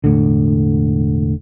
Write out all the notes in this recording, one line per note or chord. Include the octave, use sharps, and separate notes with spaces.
E1 A2 D3